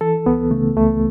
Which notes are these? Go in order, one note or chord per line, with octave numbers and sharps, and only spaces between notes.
E3 A4
C#2 B3
C#3 A3
C#2 A3